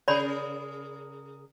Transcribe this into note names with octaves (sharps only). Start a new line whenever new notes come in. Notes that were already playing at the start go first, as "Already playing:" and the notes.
C#3 G#4 A#4 C#5 D5 B5